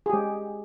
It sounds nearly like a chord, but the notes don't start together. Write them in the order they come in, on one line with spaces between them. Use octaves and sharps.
G#4 G4 G#3